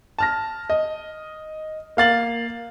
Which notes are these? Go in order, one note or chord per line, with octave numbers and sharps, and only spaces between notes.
A5 F6 A#6
D#5
A#3 F5 A6 F#7